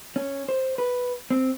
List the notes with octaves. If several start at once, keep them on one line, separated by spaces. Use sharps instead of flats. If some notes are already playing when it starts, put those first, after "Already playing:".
C#4
C5
B4
C4